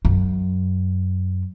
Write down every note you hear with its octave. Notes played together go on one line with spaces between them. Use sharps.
F#2